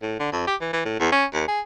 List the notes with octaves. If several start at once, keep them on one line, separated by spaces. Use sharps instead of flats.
A2
D3
F2
G4
E3
E3
A2
E2
C#4
D#2
G#4